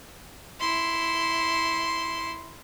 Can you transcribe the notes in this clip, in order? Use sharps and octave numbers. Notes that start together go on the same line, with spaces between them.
E4 C6